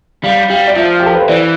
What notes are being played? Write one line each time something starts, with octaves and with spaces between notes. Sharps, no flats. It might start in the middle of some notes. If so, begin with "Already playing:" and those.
G3 F5
G3 F5
D5
F3 E5
G4
A4
B4
C5
E3 D5